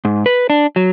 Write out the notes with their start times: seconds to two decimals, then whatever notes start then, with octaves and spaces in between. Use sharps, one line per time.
0.05 G#2
0.26 B4
0.50 D4
0.76 F#3